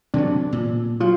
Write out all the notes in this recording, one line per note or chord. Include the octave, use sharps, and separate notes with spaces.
C3 E3 F#3 D4
A#2
F#3 F4